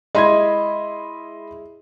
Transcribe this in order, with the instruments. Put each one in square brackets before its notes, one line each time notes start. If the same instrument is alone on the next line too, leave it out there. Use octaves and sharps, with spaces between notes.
[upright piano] G#3 E4 G#6 [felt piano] D#5 B5 C6